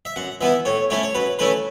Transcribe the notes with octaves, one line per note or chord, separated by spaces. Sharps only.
E5
F#2 F#5
E3 B3 E4 E5
A2 C#5
A3 C#4 E4 C#5
C#5
F#2 B4
E3 A3 C#4 E4 B4